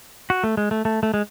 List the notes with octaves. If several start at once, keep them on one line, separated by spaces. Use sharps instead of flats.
F#4
A3
G#3
A3
A3
A3
G#3